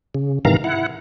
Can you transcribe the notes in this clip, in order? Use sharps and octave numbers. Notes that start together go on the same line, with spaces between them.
C#3
G#2 C3 D#3 E3 F5 A#5
E4 F#5